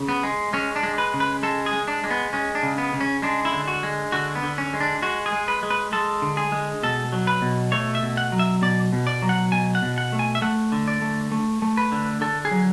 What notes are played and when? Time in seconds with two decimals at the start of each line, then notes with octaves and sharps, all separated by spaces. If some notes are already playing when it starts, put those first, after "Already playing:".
Already playing: C#3
0.09 B3
0.23 G#3
0.53 G#3 C#4
0.76 D4
0.83 G#3
0.98 B4
1.14 C#3
1.20 B4
1.43 G#3 A4
1.66 G#4
1.73 G#3
1.88 D4
2.04 G#3
2.10 B3
2.33 G#3 C#4
2.55 D4
2.63 C#3
2.78 B3
2.94 C#3
3.01 C#4
3.22 G#3 D4
3.45 E4
3.53 D3
3.68 F#4
3.83 G#3
4.12 D3 F#4
4.35 B3
4.43 D3
4.58 C#4
4.73 G#3
4.80 D4
5.02 G#3 F#4
5.26 G#4
5.33 G#3
5.48 B4
5.63 G#3
5.70 B4
5.92 G#3 A4
6.22 D3
6.37 G#4
6.52 G#3
6.83 B2 A4
7.12 F#3
7.27 B4
7.42 B2
7.72 A3 C#5
7.95 E5
8.03 B2
8.17 F#5
8.32 F#3
8.39 E5
8.62 B2 D5
8.93 B2
9.07 D5
9.22 F#3
9.29 F#5
9.52 B2 G#5
9.75 F#5
9.82 B2
9.98 F#5
10.13 A3
10.19 G#5
10.35 E5
10.42 A3 F#5
10.72 D3
10.88 D5
11.02 A3
11.32 A3
11.62 A3
11.77 B4
11.92 D3
12.21 D3 A4
12.45 G#4
12.51 F#3